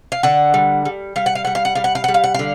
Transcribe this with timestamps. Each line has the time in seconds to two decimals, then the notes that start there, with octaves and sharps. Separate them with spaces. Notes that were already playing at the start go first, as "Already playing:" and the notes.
0.12 F5
0.23 D3 F#5
0.54 G3
0.85 G3
1.16 G3 F5
1.26 F#5
1.35 F5
1.45 G3 F#5
1.55 F5
1.65 F#5
1.75 G3 F5
1.84 F#5
1.95 F5
2.04 G3 F#5
2.14 F5
2.24 F#5
2.34 D3 F5